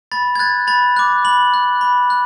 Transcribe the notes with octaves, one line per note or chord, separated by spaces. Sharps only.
B5 A6
G#6
F#6 A6
B5 A6
D6 F#6
B5 F#7
F#6
B5
F#6